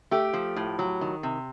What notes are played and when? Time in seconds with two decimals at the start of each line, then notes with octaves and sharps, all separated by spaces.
0.11 A3 G4
0.33 F3
0.56 A2
0.79 F#3
1.01 D#3
1.23 C3